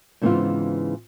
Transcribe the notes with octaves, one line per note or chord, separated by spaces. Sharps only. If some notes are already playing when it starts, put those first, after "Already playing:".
G#2 C#3 E3 B3 C4 F4